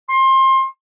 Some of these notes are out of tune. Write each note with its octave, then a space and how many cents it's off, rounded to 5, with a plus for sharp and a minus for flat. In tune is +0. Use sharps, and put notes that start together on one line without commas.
C6 +25